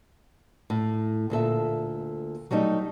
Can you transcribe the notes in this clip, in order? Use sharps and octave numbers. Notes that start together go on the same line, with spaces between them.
A2
D2 A#2 A4 E5
F#3 G3 A3 D#4 D#5